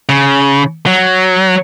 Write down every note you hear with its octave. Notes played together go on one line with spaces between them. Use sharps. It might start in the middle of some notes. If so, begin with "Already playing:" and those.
C#3
F#3